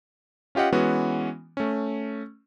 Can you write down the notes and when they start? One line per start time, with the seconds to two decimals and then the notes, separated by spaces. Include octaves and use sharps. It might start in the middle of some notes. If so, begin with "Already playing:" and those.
0.55 C#4 F4 G4 D#5 F#5
0.72 E3 G#3 B3 C#4 F#4
1.57 A3 C#4